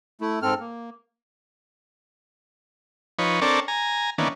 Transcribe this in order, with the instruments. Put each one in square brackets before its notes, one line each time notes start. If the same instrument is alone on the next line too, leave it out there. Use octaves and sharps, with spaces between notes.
[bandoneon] A3 E4
G#2 C4 A4 F6
A#3
[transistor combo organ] F3 D#4 B4 C#5
C4 D4 A4 A#4 C#5 D5
G#5 A#5
D#3 E3 A#3 B3 C#4 D4